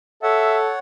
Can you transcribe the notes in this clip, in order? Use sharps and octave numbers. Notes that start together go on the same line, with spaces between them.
A4 C#5 E5 F#5